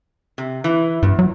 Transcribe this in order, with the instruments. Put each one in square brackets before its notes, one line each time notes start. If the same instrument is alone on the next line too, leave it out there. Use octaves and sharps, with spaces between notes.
[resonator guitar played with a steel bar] C3
E3
[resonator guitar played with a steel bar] E2 [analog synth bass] G2
[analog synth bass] F#3